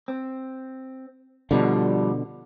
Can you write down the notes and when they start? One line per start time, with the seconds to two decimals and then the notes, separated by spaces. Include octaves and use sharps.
0.08 C4
1.51 B2 D3 F3 G3